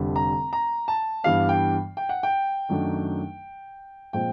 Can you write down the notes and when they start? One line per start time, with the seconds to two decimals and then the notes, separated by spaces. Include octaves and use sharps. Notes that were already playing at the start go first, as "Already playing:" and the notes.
Already playing: F1 F2 D3 G3
0.16 A#5
0.53 A#5
0.88 A5
1.24 G2 E3 G3 B3 D4 F5
1.49 G5
1.97 G5
2.09 F#5
2.23 G5
2.69 F#2 D#3 F#3 A3 D4
4.13 A#2 F3 G#3 C4 G5